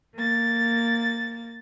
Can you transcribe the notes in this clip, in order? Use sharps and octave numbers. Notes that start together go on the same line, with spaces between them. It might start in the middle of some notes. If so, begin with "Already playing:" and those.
A#3 A6